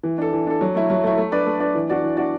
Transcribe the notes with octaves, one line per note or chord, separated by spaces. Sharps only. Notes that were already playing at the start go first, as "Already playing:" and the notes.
E3
D4 A4
E3
D4 A4
F#3
A3 E4
F#3
A3 E4
A3
D4 B4 D5
A3
D4 B4 D5
E3
D4 F#4 D5
E3
D4 F#4 D5